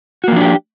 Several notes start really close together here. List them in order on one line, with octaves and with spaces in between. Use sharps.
F#4 A#3 F3 D4 G4